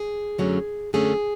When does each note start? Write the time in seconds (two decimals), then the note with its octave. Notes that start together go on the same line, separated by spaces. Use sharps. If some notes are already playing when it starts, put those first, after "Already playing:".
Already playing: G#4
0.38 F#2 D3 F#3 A3 C#4
0.93 F#2 D3 F#3 A3 C#4 G#4